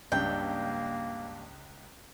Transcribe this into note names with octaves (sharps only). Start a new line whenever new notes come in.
C#2 G2 A#3 D4 G5